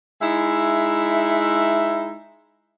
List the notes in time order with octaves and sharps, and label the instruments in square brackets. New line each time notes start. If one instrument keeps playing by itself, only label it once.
[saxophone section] G#3 D#4 E4 E5